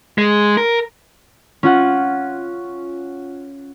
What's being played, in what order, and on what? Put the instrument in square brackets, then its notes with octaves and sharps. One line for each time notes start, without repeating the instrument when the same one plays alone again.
[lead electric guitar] G#3
A#4
[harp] C#4 F4 F#5